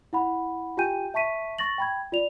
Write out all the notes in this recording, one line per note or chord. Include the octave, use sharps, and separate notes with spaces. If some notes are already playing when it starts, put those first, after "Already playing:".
E4 F#5 B5
F4 G4 G5 G#5 G6 D#7
E5 A5 C#6 B6 D#7
C#6 A6 A#6 F#7
G5 B5 G#6
F4 D5 F7